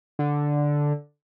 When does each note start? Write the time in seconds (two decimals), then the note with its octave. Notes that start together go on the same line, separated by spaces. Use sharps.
0.19 D3